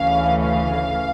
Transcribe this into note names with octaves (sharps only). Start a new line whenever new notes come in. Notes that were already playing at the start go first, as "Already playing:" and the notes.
Already playing: D2 C#3 E3 A3 C#4 F5
F5